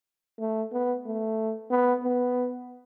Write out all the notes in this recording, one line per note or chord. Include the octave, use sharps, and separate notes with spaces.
A3
B3
A3
B3
B3